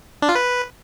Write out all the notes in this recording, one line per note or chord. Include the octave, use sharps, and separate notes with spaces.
D4
F4
B4